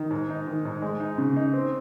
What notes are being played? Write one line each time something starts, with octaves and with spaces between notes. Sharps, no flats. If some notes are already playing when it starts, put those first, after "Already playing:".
Already playing: D#3
G#2
D#4
D#3
G#2
G#3
D#4
C#3
D#4
C4